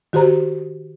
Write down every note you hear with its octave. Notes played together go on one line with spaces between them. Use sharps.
D#3 F#4 G4 C5 A#5